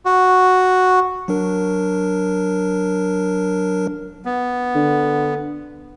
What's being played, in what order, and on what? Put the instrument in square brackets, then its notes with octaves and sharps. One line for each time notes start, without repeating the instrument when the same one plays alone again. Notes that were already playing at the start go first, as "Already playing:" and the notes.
[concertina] F#4
[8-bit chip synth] F#3 D4 A#4
[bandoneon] B3
[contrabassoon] D3